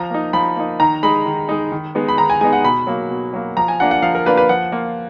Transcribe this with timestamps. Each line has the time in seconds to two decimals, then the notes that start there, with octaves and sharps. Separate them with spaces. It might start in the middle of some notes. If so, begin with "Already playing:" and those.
Already playing: F3 A#5
0.10 A#3 D#4
0.33 F3 B5
0.56 A#3 D#4
0.80 D#3 A#5
1.03 G#3 D#4 B5
1.26 D#3
1.49 G#3 D#4
1.72 D#3
1.95 G#3 B3 D#4
2.08 B5
2.18 D#3 A#5
2.30 G#5
2.41 G#3 B3 D#4 G#5
2.53 F#5
2.64 B2 B5
2.87 F#3 A#3
3.11 B2
3.33 F#3 A#3
3.57 F3 A#5
3.68 G#5
3.80 A#3 D4 F4 F#5
3.91 F#5
4.02 F3 F5
4.15 A#4
4.26 A#3 D4 F4 B4
4.37 B4
4.49 F3 F#5
4.72 A#3 F4